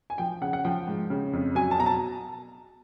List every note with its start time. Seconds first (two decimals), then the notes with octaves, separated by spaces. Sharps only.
0.10 G#5
0.18 F3 G5
0.42 C#3 F#5
0.53 F#5
0.65 F3 G5
0.88 G#2
1.10 C#3
1.33 F2
1.55 F#3 G#5
1.71 A5
1.78 B2 A#5
1.86 A5